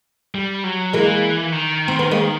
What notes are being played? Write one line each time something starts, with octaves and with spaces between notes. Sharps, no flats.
G3
F#3
E3 G#3 A#3
D#3
C4
B3
G#3 A#3